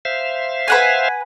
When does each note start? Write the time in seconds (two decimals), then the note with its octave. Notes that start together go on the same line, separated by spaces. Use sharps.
0.05 C5 E5 F5
0.68 B4 F#5 G#5